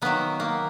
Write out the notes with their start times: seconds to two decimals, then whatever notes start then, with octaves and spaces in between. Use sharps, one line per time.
0.02 D#3 F#3 A#3 B3
0.40 A#3